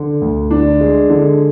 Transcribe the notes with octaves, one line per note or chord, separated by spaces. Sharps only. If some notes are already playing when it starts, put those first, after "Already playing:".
Already playing: D3
D2
D4
G#3
D3